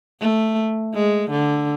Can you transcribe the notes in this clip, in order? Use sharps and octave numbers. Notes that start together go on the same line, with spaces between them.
A3
G#3
D3